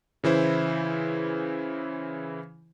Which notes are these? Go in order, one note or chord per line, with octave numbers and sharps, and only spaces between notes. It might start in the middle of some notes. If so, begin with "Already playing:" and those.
C#3 E3 E4 C5